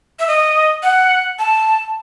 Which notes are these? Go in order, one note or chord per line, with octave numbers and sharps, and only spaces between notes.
E5
D#5
F#5
A5